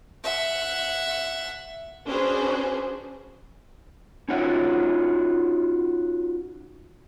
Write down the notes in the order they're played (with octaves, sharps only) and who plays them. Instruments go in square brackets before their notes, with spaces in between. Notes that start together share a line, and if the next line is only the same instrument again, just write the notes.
[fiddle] E5 F#5
[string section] C#4 D4 F#4 G#4 B4 C5
[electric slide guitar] C#4 D#4 F4 F#4 C#5 F#5